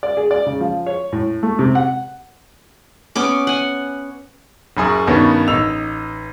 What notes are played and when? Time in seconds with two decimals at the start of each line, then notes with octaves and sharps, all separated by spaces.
0.03 D5
0.17 G#4
0.31 D5
0.46 C#3
0.60 F3
0.86 C#5
1.13 A2
1.43 A3
1.59 C3
1.75 F#5
3.16 B3 C#4 D6
3.47 F#5 G#5
4.77 F#1 F#2 G#4
5.07 G2 B2 D#3 B3 C#4
5.48 A1 D#4 E6 F7